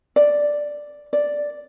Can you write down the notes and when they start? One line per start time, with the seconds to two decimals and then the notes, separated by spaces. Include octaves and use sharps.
0.16 D5
1.13 D5